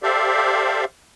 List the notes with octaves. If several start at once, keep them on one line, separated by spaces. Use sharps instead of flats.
G4 A4 C5 D5 E5 F5